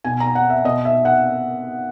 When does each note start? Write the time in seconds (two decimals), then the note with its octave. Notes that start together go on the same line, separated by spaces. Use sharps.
0.04 B2 G#5
0.20 A#5
0.35 F#5
0.50 E5
0.64 B2 D#5
0.85 E5
1.05 F#5